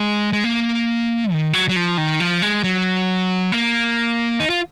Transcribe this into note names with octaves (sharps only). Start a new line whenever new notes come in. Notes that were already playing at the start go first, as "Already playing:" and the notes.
Already playing: G#3
G#3
A#3
D#3
F#3
F#3
F3
D#3
F3
G#3
F#3
A#3
D#4
F4